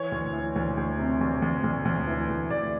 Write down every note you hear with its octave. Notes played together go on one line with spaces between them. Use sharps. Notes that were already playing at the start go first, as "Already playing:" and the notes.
Already playing: E3 C#5
D2
E3
D2
D2
C3
D2
D2
D2
D2
E3
D2
D2 D5